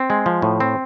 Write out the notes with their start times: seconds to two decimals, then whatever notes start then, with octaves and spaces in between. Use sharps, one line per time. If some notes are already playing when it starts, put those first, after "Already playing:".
Already playing: C4
0.10 G#3
0.26 F3
0.42 A2
0.60 C4